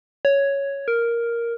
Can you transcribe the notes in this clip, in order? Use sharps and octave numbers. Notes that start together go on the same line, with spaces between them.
C#5
A#4